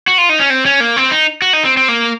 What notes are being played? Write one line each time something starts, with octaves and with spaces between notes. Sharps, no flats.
F#4
F4
D#4
C#4
C4
C#4
A#3
C4
D#4
F#4
D#4
C4
C4
A#3